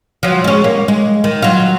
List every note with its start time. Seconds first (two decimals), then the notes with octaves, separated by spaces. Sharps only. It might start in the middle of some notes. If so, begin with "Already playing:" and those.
0.23 F3 F#3
0.44 G#3 C#4
0.64 A#3
0.88 G#3
1.24 D#3
1.42 F#3 F4